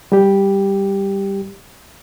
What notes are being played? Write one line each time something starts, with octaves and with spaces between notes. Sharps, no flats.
G3 G4